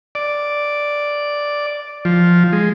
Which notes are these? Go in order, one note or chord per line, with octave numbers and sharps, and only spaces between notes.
D5
F3
G#3